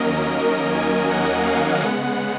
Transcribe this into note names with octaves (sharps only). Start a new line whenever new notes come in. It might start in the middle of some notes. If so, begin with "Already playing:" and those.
Already playing: D#2 D#3 F#3 A#3 C#4 A#4 D#5
A#4
G#5
F#5
F5
C#3 G#3 B3 F#5